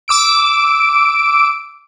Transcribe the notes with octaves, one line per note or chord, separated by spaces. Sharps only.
D6 E6 D7